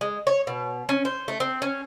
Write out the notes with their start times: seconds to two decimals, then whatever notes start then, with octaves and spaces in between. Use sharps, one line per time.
0.01 G#3
0.27 C#5
0.47 B2
0.89 C#4
1.05 C5
1.28 A3
1.40 C4
1.62 C#4